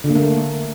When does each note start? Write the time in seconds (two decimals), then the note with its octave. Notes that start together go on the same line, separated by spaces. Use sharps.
0.04 D3
0.10 A#3
0.15 A3